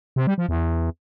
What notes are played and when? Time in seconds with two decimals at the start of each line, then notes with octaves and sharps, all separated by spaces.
0.16 C3
0.27 G3
0.38 F3
0.49 E2